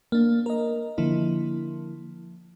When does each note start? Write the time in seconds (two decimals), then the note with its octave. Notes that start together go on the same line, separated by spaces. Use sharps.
0.12 A#3 D4
0.46 A#4 D#5
0.98 D3 F3 A#3 E4